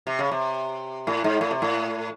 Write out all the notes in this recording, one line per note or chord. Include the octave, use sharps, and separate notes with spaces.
C3
C#3
C3
A2
G#2
A2
C3
A2